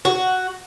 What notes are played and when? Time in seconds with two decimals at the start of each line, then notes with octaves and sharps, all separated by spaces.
0.05 F#4